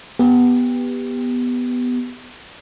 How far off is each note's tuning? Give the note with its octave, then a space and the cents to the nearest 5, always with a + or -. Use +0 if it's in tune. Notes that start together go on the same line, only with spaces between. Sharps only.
B3 +0 G4 +15